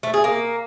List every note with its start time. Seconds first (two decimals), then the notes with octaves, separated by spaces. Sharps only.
0.03 A3
0.14 G#4
0.24 A#3